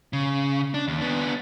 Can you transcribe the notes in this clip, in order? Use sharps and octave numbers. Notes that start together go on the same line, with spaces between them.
C#3
D4
D#2
B3 D4